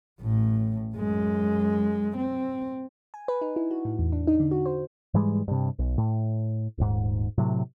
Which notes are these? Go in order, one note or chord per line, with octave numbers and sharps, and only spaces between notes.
A1 A2
F#2 G#3
C4
G#5
B4
D#4
E4
F#4
A2
E2
D4
D#4
D3
F#4
C5
G#2 E3 G3 G#3
G2 C3
B1
A2
D#1 G#2
A2 C3 F#3